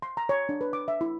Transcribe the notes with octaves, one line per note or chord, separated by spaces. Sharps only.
C6
A#5
C#5
D4
B4
D6
E5
E4